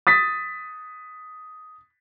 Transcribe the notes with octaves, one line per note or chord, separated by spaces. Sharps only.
D#6 A6 B6